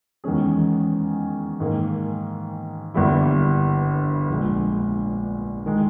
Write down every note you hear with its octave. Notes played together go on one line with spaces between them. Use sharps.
E2 D#3 G#3 C#4 G#4
G#2 D#3 A#3
G1 G2 G3 A#3 E4
A#1 A#2 G#3
D#3 G#3